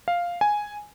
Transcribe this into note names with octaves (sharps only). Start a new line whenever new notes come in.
F5
G#5